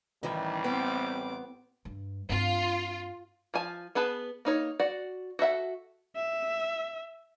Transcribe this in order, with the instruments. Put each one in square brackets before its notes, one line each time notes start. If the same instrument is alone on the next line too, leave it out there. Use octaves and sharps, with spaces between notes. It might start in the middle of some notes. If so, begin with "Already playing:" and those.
[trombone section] A1 G3 [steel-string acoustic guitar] D#3 E3
[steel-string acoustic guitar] B3 [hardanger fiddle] C4 D6
[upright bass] G2
[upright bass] G2 C4 [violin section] F4
[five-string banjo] F3 F4 G#5 A5
B3 G#4 B4 A5
A#3 D#4 C#5
F#4 D5 F#5
F#4 A4 E5 F#5
[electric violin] E5